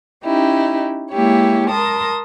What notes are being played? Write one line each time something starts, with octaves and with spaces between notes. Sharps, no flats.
C#4 D#4 E4 G4
G#3 A#3 E4 G4 C#5
A#4 A5 C6 D#6